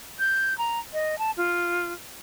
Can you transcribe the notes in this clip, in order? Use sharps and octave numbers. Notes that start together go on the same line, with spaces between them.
G6
A#5
D#5
A5
F4